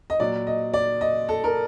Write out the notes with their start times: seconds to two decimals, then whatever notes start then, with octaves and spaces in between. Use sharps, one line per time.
0.10 D#5
0.20 A#2 F#3 D5
0.47 D#5
0.74 D5
1.01 D#5
1.29 A4
1.44 A#4